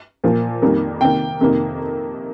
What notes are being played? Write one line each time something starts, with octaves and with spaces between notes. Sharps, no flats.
A#2 F3 A#3
F2 D#3 G3 A#3
C3 D#3 A#3 G5
F2 C3 D#3 A#3